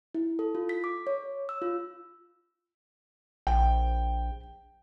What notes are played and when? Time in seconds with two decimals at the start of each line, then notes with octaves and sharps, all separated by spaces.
0.15 E4
0.39 A4
0.55 F4
0.69 B6
0.84 D6
1.07 C#5
1.49 E6
1.62 F4
3.47 A#1 G5